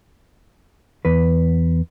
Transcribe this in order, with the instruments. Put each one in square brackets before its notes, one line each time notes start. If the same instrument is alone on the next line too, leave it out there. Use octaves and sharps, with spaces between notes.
[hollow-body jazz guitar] E2 B4